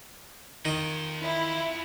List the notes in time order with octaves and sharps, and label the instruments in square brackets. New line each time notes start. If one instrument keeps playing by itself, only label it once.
[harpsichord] D#3 D#4 [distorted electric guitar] F4 G5
[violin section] E4